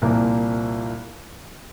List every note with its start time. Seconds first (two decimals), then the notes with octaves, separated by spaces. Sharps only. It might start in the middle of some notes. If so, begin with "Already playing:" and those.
0.02 C2 A#2 F3 A#3